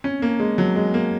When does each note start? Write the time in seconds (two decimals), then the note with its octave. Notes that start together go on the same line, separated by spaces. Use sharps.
0.04 C#4
0.22 A#3
0.40 G#3
0.58 F#3
0.76 G#3
0.94 A#3